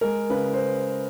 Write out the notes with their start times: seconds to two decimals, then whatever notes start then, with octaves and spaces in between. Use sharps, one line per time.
0.01 G#3 A#4
0.30 C#3 B4
0.53 C5